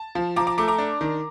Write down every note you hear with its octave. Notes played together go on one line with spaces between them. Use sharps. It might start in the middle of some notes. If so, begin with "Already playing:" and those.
Already playing: A5
F3
F3 A#5 D6
A#5 D6
A3 A#5 D6
A#5 D6
D4
D#3